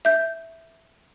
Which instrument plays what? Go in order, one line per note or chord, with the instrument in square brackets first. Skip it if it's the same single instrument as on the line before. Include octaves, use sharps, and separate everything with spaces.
[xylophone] E5 G6